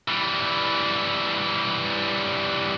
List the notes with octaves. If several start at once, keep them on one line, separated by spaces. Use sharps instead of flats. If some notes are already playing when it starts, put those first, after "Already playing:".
E3 G3